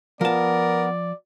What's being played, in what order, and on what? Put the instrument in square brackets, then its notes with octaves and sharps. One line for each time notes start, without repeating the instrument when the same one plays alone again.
[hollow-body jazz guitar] F3 A5 [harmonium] B3 [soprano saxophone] A#4 [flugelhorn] D5